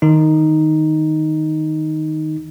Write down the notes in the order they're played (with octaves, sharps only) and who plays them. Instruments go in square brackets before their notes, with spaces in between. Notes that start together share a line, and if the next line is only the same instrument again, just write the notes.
[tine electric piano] D#3 D#4